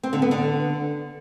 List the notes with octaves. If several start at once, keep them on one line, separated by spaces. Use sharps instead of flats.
C4
D3
B3
D3